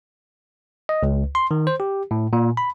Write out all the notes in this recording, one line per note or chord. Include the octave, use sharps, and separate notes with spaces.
D#5
C#2
C6
D#3
C5
G4
A2
A#2
B5